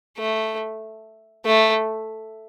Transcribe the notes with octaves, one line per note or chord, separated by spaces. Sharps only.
A3
A3